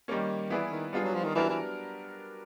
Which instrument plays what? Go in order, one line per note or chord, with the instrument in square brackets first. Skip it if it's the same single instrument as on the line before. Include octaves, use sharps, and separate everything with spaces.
[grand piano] D#3 G3 A#3 C#4
[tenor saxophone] E3 [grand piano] B3 E4 G#4 B4 D5
[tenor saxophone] D#3
[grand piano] G3 B3 D4 F4 G#4
[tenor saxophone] F#3
F3
D#3
[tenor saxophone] E3 [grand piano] F#3 B3 D4 G4 A#4
[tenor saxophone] E3